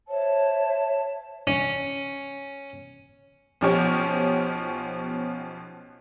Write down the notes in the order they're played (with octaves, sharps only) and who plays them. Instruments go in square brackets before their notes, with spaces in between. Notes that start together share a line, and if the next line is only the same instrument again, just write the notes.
[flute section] C5 C#5 E5 A5
[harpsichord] C#4
[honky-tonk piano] B1 B2 F3 C#4 G4 C#5